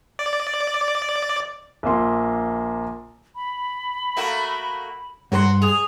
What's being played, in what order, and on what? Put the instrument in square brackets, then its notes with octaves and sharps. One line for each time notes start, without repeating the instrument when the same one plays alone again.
[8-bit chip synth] D5
[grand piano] A#1 A#3 C6
[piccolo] B5
[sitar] A3 A#3 F#4
[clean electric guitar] G2 A#4 C6 [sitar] F#3 [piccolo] F#5
[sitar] G#4 [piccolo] F7